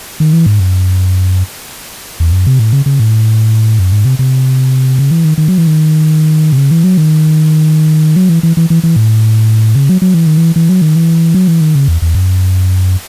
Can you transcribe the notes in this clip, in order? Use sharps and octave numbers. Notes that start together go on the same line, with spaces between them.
D#3
E3
G#2
F#2
E2
F#2
C3
A2
C#3
C#3
A2
F#2
G#2
C3
C3
C#3
E3
D#3
D#3
F#3
E3
D#3
C3
C#3
E3
F#3
D#3
F#3
E3
E3
E3
E3
E3
A2
C#3
F#3
F#3
E3
D#3
E3
E3
F#3
D#3
E3
F#3
E3
D#3
C#3
E2
E2
F#2